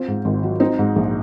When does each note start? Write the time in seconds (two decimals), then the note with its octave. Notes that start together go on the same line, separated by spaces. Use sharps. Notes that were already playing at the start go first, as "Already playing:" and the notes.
Already playing: C4 F4
0.08 G#2
0.25 G#1
0.43 F#3
0.60 C4 D#4
0.79 G#2
0.96 A#1